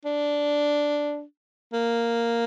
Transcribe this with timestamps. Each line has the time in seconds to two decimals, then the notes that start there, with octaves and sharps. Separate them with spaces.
0.05 D4
1.73 A#3